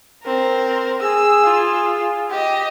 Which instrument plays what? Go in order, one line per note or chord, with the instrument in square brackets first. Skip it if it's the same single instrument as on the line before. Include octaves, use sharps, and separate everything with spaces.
[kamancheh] C4 A#4
[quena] G#4 [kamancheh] E6
[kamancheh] F4
G4 D#5